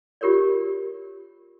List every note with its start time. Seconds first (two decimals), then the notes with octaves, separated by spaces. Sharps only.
0.21 F4 G4 A#4 C#5 D5